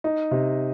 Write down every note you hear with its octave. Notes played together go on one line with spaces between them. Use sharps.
D#4
C3